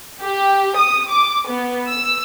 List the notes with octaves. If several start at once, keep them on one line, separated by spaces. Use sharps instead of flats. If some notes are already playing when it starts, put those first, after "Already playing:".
G4
D#6
D6
B3
E6